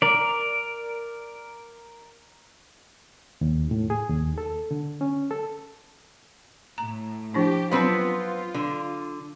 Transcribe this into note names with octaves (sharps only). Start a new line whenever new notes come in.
A#4 D5
D#2
A2
G#4
D#2
A4
D3
C#4
A4
A2 A#5
F3 D4 E4 G4
F#3 B3 C4 F4 B4 A5
D3